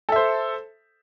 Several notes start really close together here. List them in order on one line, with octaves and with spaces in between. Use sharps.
A4 E5 C5